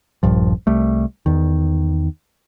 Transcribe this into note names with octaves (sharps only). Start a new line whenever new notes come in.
D#1 A#1 G2 F3
C2 G3 A3
E2 D#3